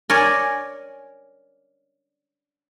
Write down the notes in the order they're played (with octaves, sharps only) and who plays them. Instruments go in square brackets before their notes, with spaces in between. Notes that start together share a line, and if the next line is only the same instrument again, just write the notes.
[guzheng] A#4 C#5 D5 G#5